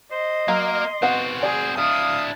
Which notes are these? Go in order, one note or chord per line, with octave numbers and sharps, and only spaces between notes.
C5 D#5
F#3 A#3 A#4 F5 C6
B3 C4 F#4 F5 F#5
G#4 D5
D4 E4 F5 D#6